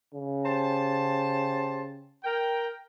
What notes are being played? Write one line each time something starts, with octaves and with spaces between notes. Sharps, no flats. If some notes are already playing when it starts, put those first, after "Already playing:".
C#3
G4 C5 A5
A#4 G5